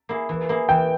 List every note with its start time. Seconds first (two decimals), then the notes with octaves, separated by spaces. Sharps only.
0.09 A#3 E4 G#4
0.29 E3
0.49 A#3 E4 G#4
0.69 E3 G5